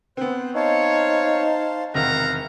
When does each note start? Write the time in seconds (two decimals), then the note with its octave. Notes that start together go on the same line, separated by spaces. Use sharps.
0.17 B3 C4 C5 F#6
0.55 D#4 C5 C#5 F5 A5
1.94 E1 C3 D#3 F5 F#5 A#5